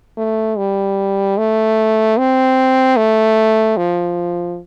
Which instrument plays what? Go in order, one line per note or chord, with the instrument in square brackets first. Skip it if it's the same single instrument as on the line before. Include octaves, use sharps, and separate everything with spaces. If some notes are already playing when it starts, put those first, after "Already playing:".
[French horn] A3
G3
A3
C4
A3
F3